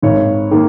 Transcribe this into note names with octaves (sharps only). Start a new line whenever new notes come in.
G#1 C#5
D#3 A#3